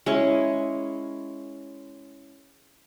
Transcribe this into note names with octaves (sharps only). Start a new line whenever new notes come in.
G#3 C#4 E4 C#6